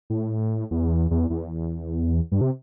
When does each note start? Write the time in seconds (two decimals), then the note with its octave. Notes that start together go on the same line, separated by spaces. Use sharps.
0.10 A2
0.71 E2
1.11 E2
1.30 E2
2.32 G2
2.41 C3